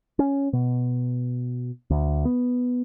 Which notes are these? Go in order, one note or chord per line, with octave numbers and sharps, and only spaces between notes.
C#4
B2
D2
B3